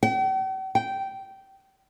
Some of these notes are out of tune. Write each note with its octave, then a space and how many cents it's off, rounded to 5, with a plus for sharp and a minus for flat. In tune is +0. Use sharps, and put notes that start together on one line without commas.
G5 -45
G5 -15